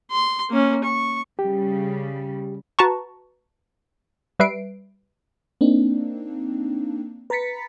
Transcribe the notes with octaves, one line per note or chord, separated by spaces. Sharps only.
C6
A#3 C#4
C#6
C#3 G3 G4
F#4 B4 A5 A#5 C#6
G3 B4 E5 C7 D7
A#3 C4 D4 D#4
B4 A#5 B5 A6 B6 C#7